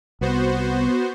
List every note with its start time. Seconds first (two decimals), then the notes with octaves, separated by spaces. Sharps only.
0.21 C2 B3 F#4 C5